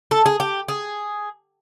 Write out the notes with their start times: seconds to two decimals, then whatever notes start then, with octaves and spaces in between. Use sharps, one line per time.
0.11 A4
0.26 G#4
0.40 G4
0.68 G#4